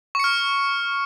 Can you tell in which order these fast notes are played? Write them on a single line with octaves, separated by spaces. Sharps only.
C#6 C#7 F6